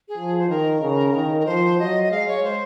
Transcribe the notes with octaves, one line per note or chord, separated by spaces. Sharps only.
G#4
F3
C5
D#3 A#4
C#3
D#3
A#4
F3 C5
F#3 D#5
D#5
G#3 F5
C#5
C5